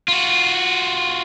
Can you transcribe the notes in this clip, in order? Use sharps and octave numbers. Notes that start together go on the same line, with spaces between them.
F4 F#4